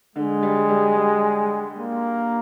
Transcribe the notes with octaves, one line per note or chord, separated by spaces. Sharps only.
D3 G#3
G3
G3
G3
A#3